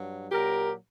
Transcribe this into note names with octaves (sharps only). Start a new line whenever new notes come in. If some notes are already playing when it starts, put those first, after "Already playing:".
Already playing: G2 F#3
A#2 F#3 G4 A#4